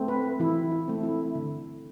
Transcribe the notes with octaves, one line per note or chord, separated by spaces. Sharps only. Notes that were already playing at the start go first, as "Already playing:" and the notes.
Already playing: A3 C4
B4
E3 E4
E4
A3 C4
E4
D3